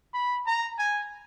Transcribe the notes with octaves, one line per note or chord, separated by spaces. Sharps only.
B5
A#5
G#5